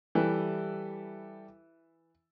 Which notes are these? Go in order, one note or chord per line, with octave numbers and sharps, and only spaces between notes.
E3 G3 G4 A4 E5